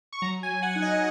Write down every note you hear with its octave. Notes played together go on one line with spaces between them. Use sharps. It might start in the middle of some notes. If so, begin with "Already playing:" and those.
C#6
F#3 A#5
G#5
F#3
F#5
D#4
D#5